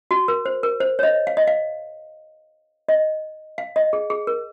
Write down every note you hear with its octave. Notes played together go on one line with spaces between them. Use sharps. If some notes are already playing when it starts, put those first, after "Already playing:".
F#4
A#4
C5
A#4
C5
C#5
D#5
F5
D#5
F5
D#5
F5
D#5
G#4
G#4
A#4